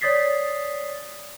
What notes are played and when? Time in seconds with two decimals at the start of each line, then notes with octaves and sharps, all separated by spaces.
0.01 C#5 D5 D#6 A6 B6 C7